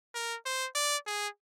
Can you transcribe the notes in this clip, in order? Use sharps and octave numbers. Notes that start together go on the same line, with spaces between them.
A#4
C5
D5
G#4